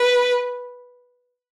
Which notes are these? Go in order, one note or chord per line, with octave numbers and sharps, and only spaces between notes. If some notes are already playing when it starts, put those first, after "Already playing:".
Already playing: B4